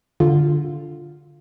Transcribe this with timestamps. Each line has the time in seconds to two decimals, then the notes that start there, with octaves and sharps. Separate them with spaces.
0.20 D3 F4